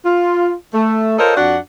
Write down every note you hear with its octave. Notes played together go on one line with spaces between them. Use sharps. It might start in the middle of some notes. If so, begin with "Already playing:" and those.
F4
A3
F4 A4 A#4 C5 C#5 D#5
F2 D4 F#4 F#5